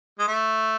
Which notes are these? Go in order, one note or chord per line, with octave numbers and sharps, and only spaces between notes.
G#3
A3